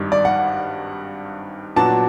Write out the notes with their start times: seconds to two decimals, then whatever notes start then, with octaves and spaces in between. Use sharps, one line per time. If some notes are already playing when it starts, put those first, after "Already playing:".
Already playing: G#1 G2 D#3 G3
0.12 D5
0.25 F#5
1.76 A#2 F#3 B3 D4 F#4 A5